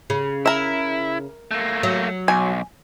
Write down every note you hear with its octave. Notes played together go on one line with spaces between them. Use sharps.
C#3
E4 A#4 E5
A3 A#3
F#3
B1 G#5